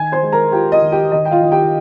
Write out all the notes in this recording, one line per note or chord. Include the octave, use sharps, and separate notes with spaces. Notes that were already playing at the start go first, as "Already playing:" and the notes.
Already playing: D#3 G#5 G#6
C5 C6
G#3
A#4 A#5
F4 G4 G5
D#5
D#3
G4 G5
D#3 D#5
G5
F4 F5
D#3
G4 G5